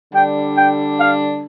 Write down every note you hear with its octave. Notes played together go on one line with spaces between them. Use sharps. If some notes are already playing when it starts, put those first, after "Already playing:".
D3 G3 D4 G5
G5
F5